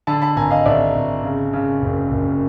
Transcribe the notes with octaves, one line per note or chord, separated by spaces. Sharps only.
D3 A5 B5
A5 B5
G#1 G#5 A#5
D#5 F5
G#1 D5 E5
G#1
C#3
C#3
F#1
F#1